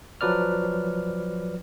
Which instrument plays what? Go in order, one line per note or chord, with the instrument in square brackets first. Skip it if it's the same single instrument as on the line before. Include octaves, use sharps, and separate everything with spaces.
[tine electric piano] F3 F#3 B4 D5 F6